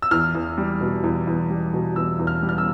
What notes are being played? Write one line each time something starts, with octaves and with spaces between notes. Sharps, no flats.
E6
E2 F6
E2
G3
B2
E2
E2
G3
B2
E2 E6
E2
F6
G3
F6
E6